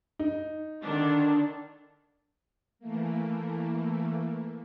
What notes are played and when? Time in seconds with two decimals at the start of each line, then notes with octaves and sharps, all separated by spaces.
0.19 D#4
0.84 D3 D#3 D4
2.79 E3 A3 A#3